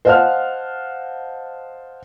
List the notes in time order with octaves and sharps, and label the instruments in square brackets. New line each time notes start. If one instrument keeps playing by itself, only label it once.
[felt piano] C5 D#5 F5 F#5 A5 F6